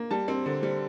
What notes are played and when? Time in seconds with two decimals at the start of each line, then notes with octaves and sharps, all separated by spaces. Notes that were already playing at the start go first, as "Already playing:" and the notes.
Already playing: A#3
0.11 G3 A5
0.28 C4
0.46 D3
0.63 G3